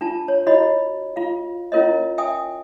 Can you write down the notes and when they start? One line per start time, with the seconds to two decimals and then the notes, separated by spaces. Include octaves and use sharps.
0.01 D4 F4 A5
0.28 C#5
0.47 E4 F#4 C#5 D#5 B5
1.16 F4 F5
1.72 C#4 E4 F4 A#4 C#5 D#5
2.18 E5 G5 G#5 D#6